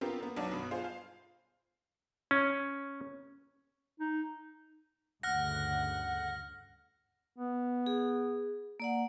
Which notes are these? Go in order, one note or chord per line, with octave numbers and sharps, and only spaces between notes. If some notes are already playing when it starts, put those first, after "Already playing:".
B3 C4 F4 G4 A#4
A#3 B3
B1 F#3 D#4 D5 F#5 A5
G2 B2
F4 G#4 C5 F5
F5
C#4
D#4
D2 G2 C#3 F#5 F6 A#6
B3
G#4
A#3 D5 F#5